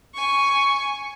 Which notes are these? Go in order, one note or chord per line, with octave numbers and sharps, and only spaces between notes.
G#5 C#6